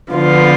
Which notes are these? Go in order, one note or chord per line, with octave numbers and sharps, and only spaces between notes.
D3 F3 B3 F4